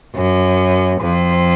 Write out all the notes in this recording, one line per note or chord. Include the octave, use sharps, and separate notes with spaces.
F#2
F2